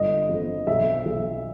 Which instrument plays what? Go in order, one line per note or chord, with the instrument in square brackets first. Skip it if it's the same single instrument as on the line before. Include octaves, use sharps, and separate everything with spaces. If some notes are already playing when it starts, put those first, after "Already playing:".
Already playing: [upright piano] G1 D#5
F2
B1 E5
B1